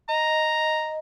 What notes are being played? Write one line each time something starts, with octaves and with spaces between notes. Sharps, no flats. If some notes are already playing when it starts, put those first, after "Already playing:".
D#5 A#5